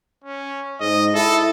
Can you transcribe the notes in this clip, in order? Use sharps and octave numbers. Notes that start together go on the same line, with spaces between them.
C#4
G#2 D#5
E4 A4